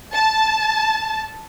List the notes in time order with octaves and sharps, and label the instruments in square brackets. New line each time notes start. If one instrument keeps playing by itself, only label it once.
[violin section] A5